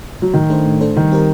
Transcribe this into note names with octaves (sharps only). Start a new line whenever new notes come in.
F#3
A2 D#3
A3 D4 A4 C5
A2
A3 D4 A4 C5
D#3 G3
C4 G4 A#4